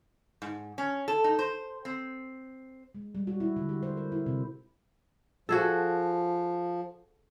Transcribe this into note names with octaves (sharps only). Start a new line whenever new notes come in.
G#2
C#4
A4
D#4
C5
C4
G#3
G3
F#4
E4
D3
G4
C5
A#4
E4
C3
F3 F#4 G#4 A4